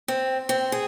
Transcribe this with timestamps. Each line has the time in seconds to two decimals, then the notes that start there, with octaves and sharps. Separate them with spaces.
0.08 C4
0.49 C4
0.72 G#4